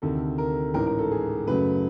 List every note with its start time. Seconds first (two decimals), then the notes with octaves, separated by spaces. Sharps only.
0.02 D2 C3 D#3 A4
0.38 A#4
0.74 A1 G#2 E3 A#4
0.87 A#4
0.98 A4
1.11 G#4
1.47 F#2 C#3 F#3 A3 B4